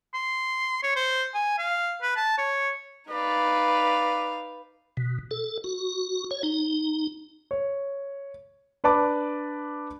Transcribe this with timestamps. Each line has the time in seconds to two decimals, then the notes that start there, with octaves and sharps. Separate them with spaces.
0.14 C6
0.83 C#5
0.96 C5
1.34 G#5
1.59 F5
2.02 B4
2.16 A5
2.38 C#5
3.11 D#4 B4 D5 F5
4.97 B2
5.31 A4
5.64 F#4
6.31 C#5
6.43 D#4
7.51 C#5
8.84 D4 B4 D5 A5 D6